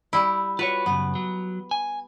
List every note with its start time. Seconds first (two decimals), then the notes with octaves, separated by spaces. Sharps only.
0.13 G3 E4
0.59 F4 F#4 B4 C#5
0.86 F#2 C#3 B3
1.15 F#3
1.71 G#5